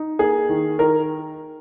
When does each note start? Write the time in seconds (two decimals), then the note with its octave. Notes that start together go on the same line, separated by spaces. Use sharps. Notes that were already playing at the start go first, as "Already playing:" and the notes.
Already playing: D#4
0.19 A#3 G#4
0.49 D#3
0.79 D#3 A#4